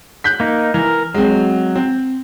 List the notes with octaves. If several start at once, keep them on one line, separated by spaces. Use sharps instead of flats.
F#6 G6 B6
A#3 D#4
E3 A#4
F#3 G#3 C4
C4